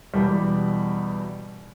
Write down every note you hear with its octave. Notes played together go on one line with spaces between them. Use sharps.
E2 B2 G3